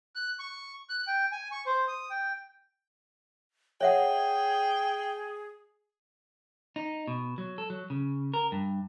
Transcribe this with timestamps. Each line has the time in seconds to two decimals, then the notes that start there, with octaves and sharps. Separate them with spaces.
0.15 F#6
0.39 C#6
0.89 F#6
1.07 G5
1.32 G#5
1.52 C#6
1.67 C5
1.88 D#6
2.10 G5
3.81 G#4 C#5 E5 F#5 G5
6.76 D#4
7.07 B2
7.38 F#3
7.58 A4
7.70 F#3
7.90 C#3
8.34 A#4
8.52 G2